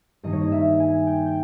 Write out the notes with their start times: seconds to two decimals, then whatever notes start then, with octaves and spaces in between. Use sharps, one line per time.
0.23 G2 D#3 A#3 D#4 D#5
0.33 C#5
0.42 D#5
0.52 E5
0.80 G#5
1.07 G5
1.26 G5